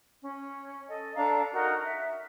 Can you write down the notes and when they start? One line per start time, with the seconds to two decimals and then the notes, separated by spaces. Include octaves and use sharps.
0.22 C#4
0.87 A4 D#5
1.14 D4 A4 F5 A#5
1.51 D#4 F#4 A#4 F#5
1.84 E5